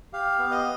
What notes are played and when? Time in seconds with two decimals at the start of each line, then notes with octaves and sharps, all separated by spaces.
0.13 G4 F5
0.39 B3
0.51 D#5